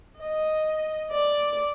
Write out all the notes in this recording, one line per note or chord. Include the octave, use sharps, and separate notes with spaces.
D#5
D5